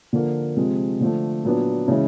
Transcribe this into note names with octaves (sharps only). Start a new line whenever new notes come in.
D3 F3 A#3
C3 F3 G#3 C4
D3 F3 A3
A#2 F#3 B3 D4
C#3 E3 G#3 C#4 E4